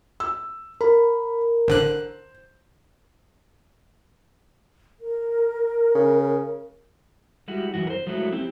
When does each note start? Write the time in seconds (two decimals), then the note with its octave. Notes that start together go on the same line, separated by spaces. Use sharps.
0.20 E6
0.81 A#4 B5
1.68 A1 D3 C5 F#6
5.00 A#4
5.95 C#3
7.48 G3 G#3 E4 F#4
7.74 F#2 E3 F#4
7.87 A#4 C5
8.07 F3 F#3 G#3 A3 E4 F#4
8.32 C4 E4 G4